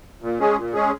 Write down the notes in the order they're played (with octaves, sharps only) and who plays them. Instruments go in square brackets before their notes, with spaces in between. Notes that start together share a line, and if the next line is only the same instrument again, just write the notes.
[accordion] A#2
G#3 C#4 G#4
A#2
G#3 C#4 G#4